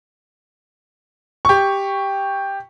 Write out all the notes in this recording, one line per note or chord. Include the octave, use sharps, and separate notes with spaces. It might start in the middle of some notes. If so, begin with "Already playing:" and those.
G4 C#6